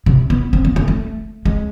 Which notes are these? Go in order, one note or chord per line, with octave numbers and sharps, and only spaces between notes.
C3
B3
C4
B3
A3
A3
G#3